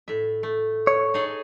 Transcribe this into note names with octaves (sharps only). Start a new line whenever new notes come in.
A2 E5
A3
C#5
D#4 G#4 A4